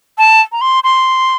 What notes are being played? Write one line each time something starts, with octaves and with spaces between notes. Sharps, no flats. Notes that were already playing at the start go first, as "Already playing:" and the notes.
A5
A#5
C6
C6